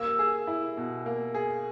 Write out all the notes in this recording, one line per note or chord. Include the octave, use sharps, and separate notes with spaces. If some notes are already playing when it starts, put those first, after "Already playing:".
Already playing: A#3 E6
G#4
E4
B2
A#3
G#4